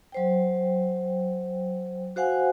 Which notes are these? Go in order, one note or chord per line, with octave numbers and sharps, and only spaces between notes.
F#3 C5 G5
F#4 C5 F5 F#5 G#5